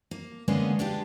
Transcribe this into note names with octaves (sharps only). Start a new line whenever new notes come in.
A#3
D3 G#3 A#3 B3 C#4
G#3 D4 F4 G4